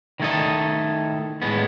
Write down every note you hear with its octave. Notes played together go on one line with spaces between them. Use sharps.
D#3 A3 E4 A4 D#5
A2 G#3 B3